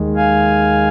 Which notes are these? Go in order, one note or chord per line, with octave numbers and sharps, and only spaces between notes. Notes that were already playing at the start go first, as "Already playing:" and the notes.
Already playing: D#2 D#3 G#3
F5 G#5